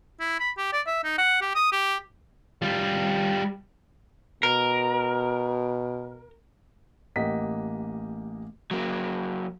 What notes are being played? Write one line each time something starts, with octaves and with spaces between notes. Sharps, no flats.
E4
B5
G4
D5
E5
D#4
F#5
G4
D#6
G4
G3 F4
B2 A#4
A1 A#3 G4 D#5 F#5 B6
F#3 A#3